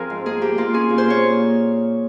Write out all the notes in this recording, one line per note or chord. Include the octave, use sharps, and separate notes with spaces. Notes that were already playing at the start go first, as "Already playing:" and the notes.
Already playing: F3 C4 G#4 A#4 F5
G#2
A#3 G#4
A#3 G4
A#3 F4
C#4 G#4
A#2
C5
A#3 C#5